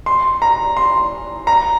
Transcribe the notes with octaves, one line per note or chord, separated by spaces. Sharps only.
C6
A#5
C6
A#5